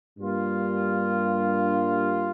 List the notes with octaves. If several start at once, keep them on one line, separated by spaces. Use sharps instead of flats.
G2 G3 A#3 F4